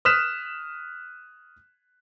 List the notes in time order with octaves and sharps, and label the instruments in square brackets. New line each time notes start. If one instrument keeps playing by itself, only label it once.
[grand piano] D#6 F6 F#6 B6 E7